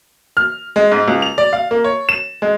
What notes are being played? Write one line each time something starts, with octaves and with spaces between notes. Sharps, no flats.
F6
G#3
G#2
C#2
F7
D5
F5
A#3
C#5
E7
G#3